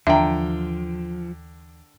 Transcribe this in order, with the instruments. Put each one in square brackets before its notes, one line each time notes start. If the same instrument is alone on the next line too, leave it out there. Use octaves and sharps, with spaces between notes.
[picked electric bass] D#2 E3 [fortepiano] D3 G5 [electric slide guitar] F3 [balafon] E5 A#5